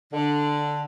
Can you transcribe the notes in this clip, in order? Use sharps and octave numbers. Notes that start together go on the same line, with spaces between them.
D3